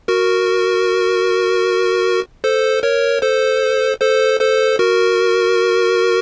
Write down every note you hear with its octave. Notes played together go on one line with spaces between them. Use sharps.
F#4 A#4
A4 C5
A#4 C#5
A4 C5
A4 C5
A4 C5
F#4 A#4